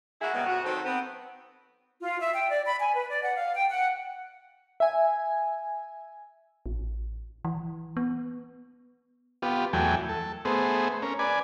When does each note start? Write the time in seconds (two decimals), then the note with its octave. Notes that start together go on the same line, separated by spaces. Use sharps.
0.21 A#3 E4 F#4 G#4 E5
0.34 A#2 C#3 G3 G#3 B3
0.46 F2 B3 F#4
0.64 D#3 F#3 C4 A4 C5
0.85 B3 C4
2.02 F4
2.20 E5
2.34 G5
2.51 D5
2.67 B5
2.80 G#5
2.95 B4
3.09 D5
3.22 F#5
3.36 F5
3.54 G5
3.70 F#5
4.80 E5 G#5
6.66 A1
7.45 E3
7.97 B3
9.42 B3 F4 G4
9.73 E2 F#3 A3 G5 G#5
10.09 A4
10.45 A3 B3 G#4 C5
11.02 C#4 A#4
11.19 B4 D5 G#5